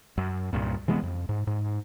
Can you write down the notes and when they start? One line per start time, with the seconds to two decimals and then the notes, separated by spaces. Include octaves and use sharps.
0.18 F#2
0.53 C2 G2 A#2
0.88 C3 E3 G#3 B3
1.03 F2
1.29 G#2
1.47 G#2